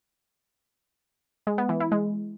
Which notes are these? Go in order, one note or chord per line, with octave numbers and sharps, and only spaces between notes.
G#3
B3
E3
E4
G#3